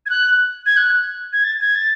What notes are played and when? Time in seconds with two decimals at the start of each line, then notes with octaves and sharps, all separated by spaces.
0.06 G#6
0.10 F#6
0.66 G#6
0.77 F#6
1.33 G#6
1.44 A6
1.61 G#6
1.75 A6